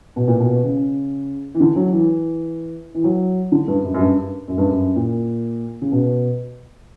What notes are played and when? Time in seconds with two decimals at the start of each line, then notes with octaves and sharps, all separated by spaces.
0.16 B2
0.28 A#2
0.40 B2
0.64 C#3
1.54 E3
1.60 D3
1.76 F#3
1.92 E3
2.94 E3
3.04 F#3
3.52 D3
3.68 G2
3.83 F#2
3.94 F#2
4.00 G2
4.48 F#2
4.58 G2
4.69 F#2
4.96 A#2
5.82 C#3
5.92 B2